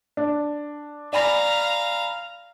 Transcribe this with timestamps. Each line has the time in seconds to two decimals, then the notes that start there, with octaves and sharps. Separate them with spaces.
0.17 D4
1.13 D5 F5 G#5 A#5 B5